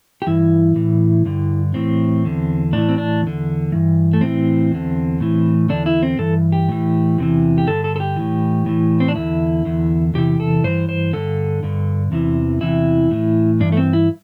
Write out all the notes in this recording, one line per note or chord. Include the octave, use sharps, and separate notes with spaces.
G4
G2 E3 E4
A2 E3
G2 D3
A2 E3 C4
E2 D3
A2 E3 D4
C4
D4
E2 D3
G2 E3
A3
A2 E3 C4
E2 D3
A2 E3
E2 D3 D4
E4
C4
G2 E3 A4
G4
A2 E3
E2 C3 E3
G4
G2 D3 A4
A4
A4
G4
A2 E3
A2 E3
C4
D4
E2 D3 E4
E2 D3
E2 C3 E3 G4
A4
G2 E3 C5
C5
G2 D3 A4
G2 D3
E2 C3 E3
E2 C3 E3 E4
A2 E3
G2 E3 D4
A3
C4
E4